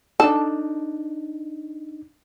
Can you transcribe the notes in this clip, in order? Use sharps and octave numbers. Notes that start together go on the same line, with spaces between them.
D4 D#4 A4